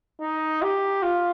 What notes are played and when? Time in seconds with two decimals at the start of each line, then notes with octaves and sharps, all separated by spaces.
0.21 D#4
0.62 G4
1.03 F4